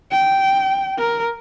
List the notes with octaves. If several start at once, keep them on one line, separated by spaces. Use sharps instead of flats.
G5
A#4